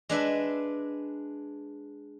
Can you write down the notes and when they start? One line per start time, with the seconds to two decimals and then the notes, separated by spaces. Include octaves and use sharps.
0.09 G#3 D4 B4 E5